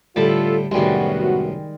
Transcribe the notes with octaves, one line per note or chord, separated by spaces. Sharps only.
A2 D3 G3 F4 A4 A5 B5
C2 F#2 A2 D#3 G3 G#3 B3 F#4